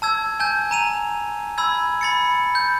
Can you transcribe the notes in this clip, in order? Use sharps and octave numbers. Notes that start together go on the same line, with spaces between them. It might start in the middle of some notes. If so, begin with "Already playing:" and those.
A5 E6 G#6
G#5 A5 G6
A#5 D#7 F7
B5 E6 G#6
B5 A6 C#7
G6